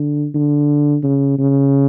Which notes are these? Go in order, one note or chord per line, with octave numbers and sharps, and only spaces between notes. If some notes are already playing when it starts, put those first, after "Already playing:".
Already playing: D3
D3
C#3
C#3